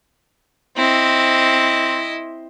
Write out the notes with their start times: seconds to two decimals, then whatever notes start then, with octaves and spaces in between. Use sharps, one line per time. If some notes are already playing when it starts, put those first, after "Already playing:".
0.77 C4 E4 D#5